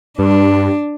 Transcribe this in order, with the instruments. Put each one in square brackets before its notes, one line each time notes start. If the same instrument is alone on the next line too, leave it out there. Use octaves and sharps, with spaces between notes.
[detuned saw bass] G2 [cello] D4